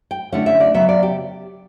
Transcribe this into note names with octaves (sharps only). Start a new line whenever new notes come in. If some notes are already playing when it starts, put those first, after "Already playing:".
G5
D3 A3 C#4 E4 F#5
E5
D5
C#3 F#3 B3 E5
D5
G4